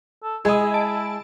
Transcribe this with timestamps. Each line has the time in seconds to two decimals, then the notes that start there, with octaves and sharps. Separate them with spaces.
0.23 A4
0.45 G#3 E4 G#4 D#5
0.74 A5 D7